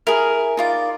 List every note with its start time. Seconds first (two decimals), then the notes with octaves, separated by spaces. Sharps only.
0.07 E4 G#4 A#4
0.57 D#4 F4 D5